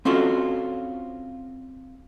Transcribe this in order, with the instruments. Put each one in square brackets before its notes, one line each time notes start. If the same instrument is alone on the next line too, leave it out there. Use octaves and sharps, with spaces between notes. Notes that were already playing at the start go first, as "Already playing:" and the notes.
[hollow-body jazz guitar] C4 C#4 F4 F#4 A4